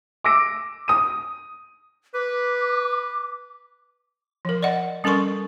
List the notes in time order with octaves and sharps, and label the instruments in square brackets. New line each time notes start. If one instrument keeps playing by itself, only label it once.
[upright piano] D6 E6 A#6 D7
D#6 D#7
[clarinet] B4 [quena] D6
[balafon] F3 A#4
D5 D#5 F#5
G3 C#4 A4 A#4 C6 C#6